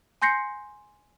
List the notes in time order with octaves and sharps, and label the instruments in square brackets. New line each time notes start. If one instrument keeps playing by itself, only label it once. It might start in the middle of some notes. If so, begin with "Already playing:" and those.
[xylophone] G#5 C6 G6 A#6 C7 C#7